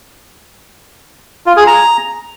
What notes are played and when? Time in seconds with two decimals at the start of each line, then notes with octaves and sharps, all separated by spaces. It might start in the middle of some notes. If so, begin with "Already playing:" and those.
1.46 F4
1.57 G#4
1.67 A#5